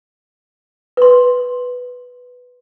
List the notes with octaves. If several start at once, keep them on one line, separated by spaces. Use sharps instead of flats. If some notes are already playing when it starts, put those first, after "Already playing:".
B4 C6